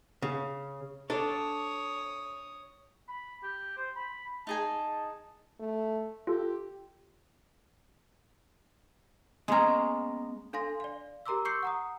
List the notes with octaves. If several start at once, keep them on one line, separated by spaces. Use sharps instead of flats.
C#3
D4 A4 C#5 D#6
B5
G4
C5
B5
D#4 G#4 G#5 A5
A3
F4 G4 A4
G#3 A#3 B3 C#4 A#5
D4 A4 F5 G#5 C6 A#6
D5 F5
G4 A#4 A#5 C6 D6 E6
C#6 D6 E6 G6 C7 C#7
F#5 A#5 D#6